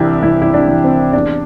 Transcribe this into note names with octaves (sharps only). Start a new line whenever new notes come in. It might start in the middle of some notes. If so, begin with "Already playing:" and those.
Already playing: C2 C3 E3 D4 E4 G4
C2 E4
E4
D4
C3 E3
C4
E2 D4